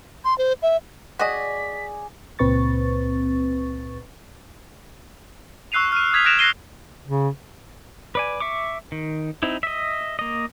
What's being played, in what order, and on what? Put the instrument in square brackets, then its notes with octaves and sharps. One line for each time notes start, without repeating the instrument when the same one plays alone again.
[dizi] C6
C5
E5
[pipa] F#4 D#5 [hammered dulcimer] G#4 D5 G#5 [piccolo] B6
[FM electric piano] C#2 A#2 C4 B4 C#6 A6
[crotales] C#6 E6 F#6 C7 D#7 F7
F6 D#7
D#6 G#6 B6 F7
F#6 G#6 A#6 D7 E7 F7
F#6 G#6 A#6 C7 D#7 G7
[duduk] C#3
[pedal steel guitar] B4 D5 G#5
E5 C#6 D6
D#3
C4 D#4 E4
D#5 E5
A#3 D#5